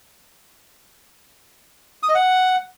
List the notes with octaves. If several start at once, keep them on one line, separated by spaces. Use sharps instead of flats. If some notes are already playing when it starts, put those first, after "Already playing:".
D#6
D#5
F#5